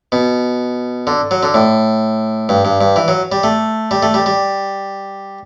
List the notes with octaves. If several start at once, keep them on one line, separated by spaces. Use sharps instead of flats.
B2
D3
F#3
D3
A2
G2
G2
G2
E3
F#3
G3
A3
G3
A3
G3
G3